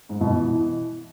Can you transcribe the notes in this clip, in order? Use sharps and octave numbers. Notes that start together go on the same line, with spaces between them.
G#2
B2
E3